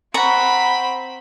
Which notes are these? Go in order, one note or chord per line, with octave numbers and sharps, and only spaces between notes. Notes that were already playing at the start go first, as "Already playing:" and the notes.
C4 F#5 A#5 B5 C#6